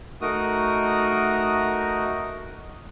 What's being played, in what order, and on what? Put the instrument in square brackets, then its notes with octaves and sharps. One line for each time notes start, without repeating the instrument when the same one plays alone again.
[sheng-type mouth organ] A3 D#4 F#4 A#4 D#6